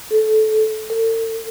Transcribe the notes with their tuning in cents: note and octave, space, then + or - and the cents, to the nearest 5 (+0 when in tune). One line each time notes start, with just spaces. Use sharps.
A4 -20
A4 +45